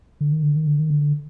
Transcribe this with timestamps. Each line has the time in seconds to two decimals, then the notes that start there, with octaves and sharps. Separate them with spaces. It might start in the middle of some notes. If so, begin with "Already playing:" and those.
0.21 D3
0.32 D#3
0.43 D3
0.56 D#3
0.67 D3
0.80 D#3
0.90 D3